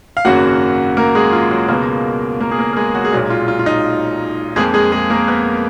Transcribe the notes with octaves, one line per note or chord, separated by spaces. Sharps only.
F5
G#1 F#2 C#3 F#3 A#3 F#4 F#5
A#3 A#4
G#3 G#4
F4
F#3 F#4
C#2 B2 G#3 A#3 B3 A#4
A#3 A#4
G#4
A#3 A#4
A#4
G#3 G#4
F#3 F#4
G#4
B1 A#2 F#3 G#3 F#4
F4
F4
F4
D#4
F2 F3 G#3 A#3 G#4
G#3 G#4
G#3 G#4
A#3 A#4
B3 B4